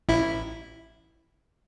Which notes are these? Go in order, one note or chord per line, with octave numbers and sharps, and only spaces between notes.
A1 E4